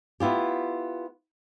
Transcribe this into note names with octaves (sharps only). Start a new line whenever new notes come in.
B3 E4 F4 G4